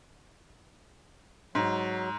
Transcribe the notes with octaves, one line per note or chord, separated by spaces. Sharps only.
G#2 F#3